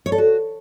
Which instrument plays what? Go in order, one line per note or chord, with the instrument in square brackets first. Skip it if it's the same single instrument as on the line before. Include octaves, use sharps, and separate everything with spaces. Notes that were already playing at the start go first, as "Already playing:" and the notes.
[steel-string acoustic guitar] C#5
A4
F#4